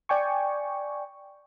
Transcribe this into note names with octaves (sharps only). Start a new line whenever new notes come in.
D5 G5 G#5 C#6